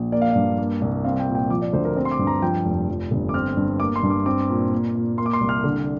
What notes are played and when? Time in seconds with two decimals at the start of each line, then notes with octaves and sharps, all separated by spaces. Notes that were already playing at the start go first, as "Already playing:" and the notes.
Already playing: A#1
0.12 A#3 D5
0.22 F5
0.31 G2 D5
0.58 A#3
0.82 C2
1.05 C4 F5
1.20 G5
1.27 A#2
1.35 G5
1.50 F3 D6
1.62 D5
1.73 D2 C5
1.85 A#4
1.96 C4 C5
2.05 C6
2.11 D6
2.19 G2
2.27 A#5
2.42 F3 G5
2.65 F1
2.88 F3
3.11 G1
3.29 D6
3.34 C4 F6
3.57 G2
3.80 A#3 D6
3.96 C6
4.03 G2
4.10 D6
4.26 C4 D6
4.49 A#2
4.72 A#3
4.95 A#2
5.18 A#3 C6
5.26 D6
5.33 C6
5.41 C2
5.49 F6
5.64 D3